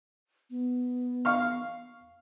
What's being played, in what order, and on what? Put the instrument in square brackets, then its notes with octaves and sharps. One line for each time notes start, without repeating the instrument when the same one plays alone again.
[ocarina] B3
[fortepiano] F5 C#6 F6